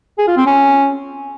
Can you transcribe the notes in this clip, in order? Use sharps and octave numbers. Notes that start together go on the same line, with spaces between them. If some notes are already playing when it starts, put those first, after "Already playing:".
G#4
F4
C4
C#4